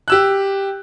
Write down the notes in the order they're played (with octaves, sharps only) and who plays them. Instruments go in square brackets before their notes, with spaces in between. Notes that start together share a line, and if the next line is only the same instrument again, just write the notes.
[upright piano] G4 E6 F#6